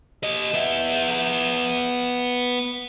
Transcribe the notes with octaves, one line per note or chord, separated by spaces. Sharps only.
G4 D#5
B3 E5